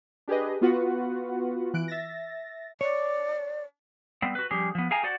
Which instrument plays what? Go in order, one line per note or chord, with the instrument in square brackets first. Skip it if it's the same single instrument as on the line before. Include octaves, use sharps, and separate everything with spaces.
[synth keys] D4 G4 G#4 B4 D#5
B3 F4 F#4 B4 F#5
E3 F#6 D7
E5 A6 A#6
[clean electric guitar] C#5 [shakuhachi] D5
[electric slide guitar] G3 B3 C4
F#4 B4
F3 G3 C#4 G4 G#4
F3 B3
G#4 F5 G5 G#5 A#5
F#4 C5 D5 F#5